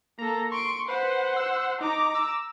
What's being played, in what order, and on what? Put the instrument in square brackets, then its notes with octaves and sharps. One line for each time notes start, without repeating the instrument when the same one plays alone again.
[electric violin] A#3 A4 [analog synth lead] A#5
[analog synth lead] C6 [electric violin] C#6 D7
[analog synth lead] B4 [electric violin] C5 F#5
[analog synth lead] E6
[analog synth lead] D#4 [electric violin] A#5 D6
[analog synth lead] E6